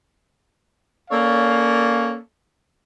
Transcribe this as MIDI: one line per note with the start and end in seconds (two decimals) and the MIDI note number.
1.11 2.17 58
1.11 2.17 61
1.11 2.17 69
1.11 2.17 73
1.11 2.17 74
1.11 2.17 77